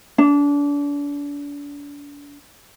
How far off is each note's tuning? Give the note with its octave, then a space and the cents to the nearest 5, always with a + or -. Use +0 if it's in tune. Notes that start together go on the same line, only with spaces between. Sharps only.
D4 -35